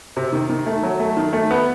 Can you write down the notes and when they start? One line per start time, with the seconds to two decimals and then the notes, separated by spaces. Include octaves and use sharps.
0.17 C3
0.33 D#3
0.50 D#3
0.66 A3
0.83 F#3
1.00 A3
1.17 D#3
1.33 A3
1.51 B3